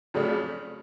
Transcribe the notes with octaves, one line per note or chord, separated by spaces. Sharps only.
F2 C#3 F#3 A3 D4